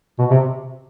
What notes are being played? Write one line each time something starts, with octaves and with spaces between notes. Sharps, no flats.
B2
C3